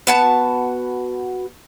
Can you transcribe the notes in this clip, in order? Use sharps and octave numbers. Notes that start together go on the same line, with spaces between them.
B3 F#4 A5